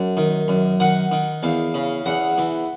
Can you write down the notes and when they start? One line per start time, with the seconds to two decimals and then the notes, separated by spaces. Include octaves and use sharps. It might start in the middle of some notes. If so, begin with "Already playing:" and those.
Already playing: F#2
0.17 D#3
0.48 F#2
0.80 D#3 F#5
1.11 D#3
1.43 E2 F5
1.74 C#3
2.06 E2 F#5
2.38 E3